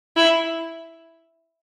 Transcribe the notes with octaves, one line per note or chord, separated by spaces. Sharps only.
E4